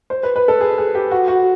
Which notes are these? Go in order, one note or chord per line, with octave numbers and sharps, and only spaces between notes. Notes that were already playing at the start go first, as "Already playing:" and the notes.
C5
B4
B4
A4
G#4
G#4
G4
F#4
F#4